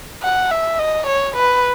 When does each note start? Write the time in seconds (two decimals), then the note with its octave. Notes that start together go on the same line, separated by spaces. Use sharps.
0.22 F#5
0.51 E5
0.79 D#5
1.07 C#5
1.36 B4